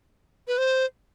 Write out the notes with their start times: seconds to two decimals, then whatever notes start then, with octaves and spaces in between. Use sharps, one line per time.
0.48 B4
0.58 C5